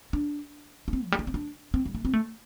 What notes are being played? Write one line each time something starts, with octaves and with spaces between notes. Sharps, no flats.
D4
D4
C4
F3
G3
A3
C4
D4
C4
G3
A3
C4
A3